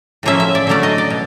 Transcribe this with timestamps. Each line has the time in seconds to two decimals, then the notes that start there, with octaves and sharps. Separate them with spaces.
0.23 A2 F3 A#3 C#4 E5
0.40 E5
0.55 D5
0.67 D3 F#3 A3 C#4 D5
0.83 D#5
0.98 D5
1.10 B2